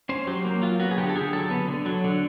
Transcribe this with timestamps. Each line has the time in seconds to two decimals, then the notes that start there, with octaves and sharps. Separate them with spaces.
0.09 C#4 C5
0.27 F#3 G4
0.45 A#3
0.62 F#3 F4
0.80 B3 F#4
0.91 G#4
0.98 D3 G4
1.09 A4
1.15 D3 G#4
1.33 F#3 A4
1.51 B3
1.68 D3
1.86 F#3
2.04 D3